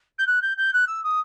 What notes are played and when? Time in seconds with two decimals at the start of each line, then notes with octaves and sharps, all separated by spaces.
0.18 G6
0.27 F#6
0.42 G6
0.57 G6
0.73 F#6
0.87 E6
1.04 D#6